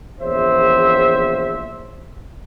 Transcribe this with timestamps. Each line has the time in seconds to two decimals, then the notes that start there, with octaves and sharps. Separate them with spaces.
0.21 A#1 E2 C#3 C5 C#5 E5